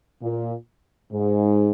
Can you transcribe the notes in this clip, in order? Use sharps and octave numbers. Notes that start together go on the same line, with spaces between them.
A#2
G#2